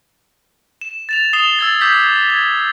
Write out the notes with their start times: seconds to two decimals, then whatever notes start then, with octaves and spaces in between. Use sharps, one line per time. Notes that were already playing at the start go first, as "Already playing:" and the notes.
0.81 E7
1.09 A6 E7 F7
1.33 D#6 C7 E7 F7 G7
1.59 E6 G#6 A6
1.81 D6 G6 G#6 B6
2.30 G#6